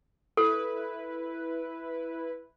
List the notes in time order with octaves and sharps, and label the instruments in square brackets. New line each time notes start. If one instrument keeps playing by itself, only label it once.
[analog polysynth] E4 B4 [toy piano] A4